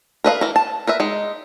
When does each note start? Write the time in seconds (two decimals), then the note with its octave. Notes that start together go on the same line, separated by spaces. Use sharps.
0.24 A#4 B4 D#5 F5
0.41 E3 A#4
0.56 A5
0.87 A#4 B4 E5
1.00 G#3 D#4